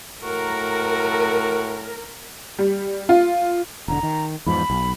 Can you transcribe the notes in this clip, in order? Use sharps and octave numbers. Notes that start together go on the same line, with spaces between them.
A2 F#4 A#4
G3
F4
E1 D3 A#5
D#3
E2 G#2 F3 B5
B1